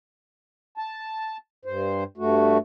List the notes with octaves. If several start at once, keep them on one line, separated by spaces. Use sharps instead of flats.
A5
G2 C5
G2 A3 F#4